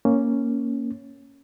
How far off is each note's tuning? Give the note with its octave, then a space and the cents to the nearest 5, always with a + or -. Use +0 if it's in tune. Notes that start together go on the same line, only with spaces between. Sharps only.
A#3 +0 C#4 +0